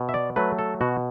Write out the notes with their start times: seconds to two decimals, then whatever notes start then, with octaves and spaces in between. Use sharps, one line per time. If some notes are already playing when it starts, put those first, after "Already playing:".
Already playing: B2
0.09 E5
0.14 D5
0.36 F#3 A3 B4
0.59 A4
0.81 B2 F#4